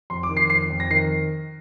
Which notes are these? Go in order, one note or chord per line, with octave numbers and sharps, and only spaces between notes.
F2 C6
D6
D#3
C7
F2 C7
F2
A#6
D#3 C7